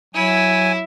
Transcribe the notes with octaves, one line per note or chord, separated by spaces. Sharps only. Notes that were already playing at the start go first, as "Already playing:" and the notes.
F#3 E4 G#5